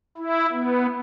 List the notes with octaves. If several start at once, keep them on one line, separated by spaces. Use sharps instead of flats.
E4
B3